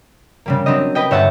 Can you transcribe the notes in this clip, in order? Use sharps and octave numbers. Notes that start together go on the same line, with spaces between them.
C#3 G3 A#3
F#3 C4 D4 G4 D#5
B4 D#5 G5
G1 C#5 E5 F#5 A5